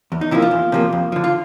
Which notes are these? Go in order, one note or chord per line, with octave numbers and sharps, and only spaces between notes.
E2
D#4
C3 F3 A#3 E4
F4
E2
C3 F3 A#3
F2
D3 F3
F4